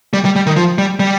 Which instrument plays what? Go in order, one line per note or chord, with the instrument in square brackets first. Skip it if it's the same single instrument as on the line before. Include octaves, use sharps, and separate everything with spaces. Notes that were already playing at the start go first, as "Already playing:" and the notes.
[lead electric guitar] G3
G3
G3
D#3
F3
G3
G3